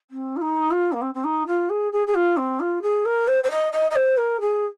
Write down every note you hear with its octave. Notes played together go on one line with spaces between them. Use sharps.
C4
F4
D#4
F4
A#3
C4
C4
D#4
F4
G#4
G#4
G#4
F4
C4
F4
G#4
A#4
C5
C5
D#5
D#5
D#5
C5
A#4
G#4